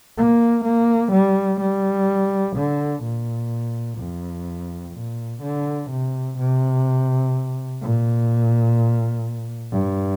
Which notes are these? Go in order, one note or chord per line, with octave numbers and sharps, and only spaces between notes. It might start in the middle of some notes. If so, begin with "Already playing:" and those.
A#3
A#3
G3
G3
D3
A#2
F2
A#2
D3
C3
C3
A#2
G2